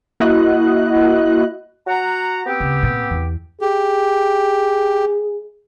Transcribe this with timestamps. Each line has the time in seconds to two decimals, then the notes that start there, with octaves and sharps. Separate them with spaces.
0.20 A#3 E4 F#4 D#5 F#6
1.87 F#4 F#5 A#5
2.45 B3 C4 G4
2.60 C#2
2.83 A#2
3.11 E2
3.61 G4 G#4